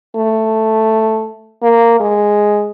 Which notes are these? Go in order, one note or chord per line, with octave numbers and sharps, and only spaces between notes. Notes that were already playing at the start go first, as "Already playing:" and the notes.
A3
A#3
G#3